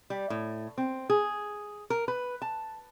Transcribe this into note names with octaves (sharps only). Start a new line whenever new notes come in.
G3
A2
C4
G#4
A#4
B4
A5